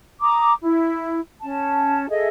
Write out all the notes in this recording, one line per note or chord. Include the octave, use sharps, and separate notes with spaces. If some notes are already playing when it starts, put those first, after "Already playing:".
A#5 D6 D#6
E4
C#4 A5
G#4 A4 D#5 E5